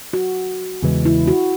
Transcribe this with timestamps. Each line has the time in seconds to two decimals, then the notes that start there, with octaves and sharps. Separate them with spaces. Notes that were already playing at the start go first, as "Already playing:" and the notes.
0.13 F#4
0.82 E2 C#3 E3 G#3
1.05 E4
1.27 F#4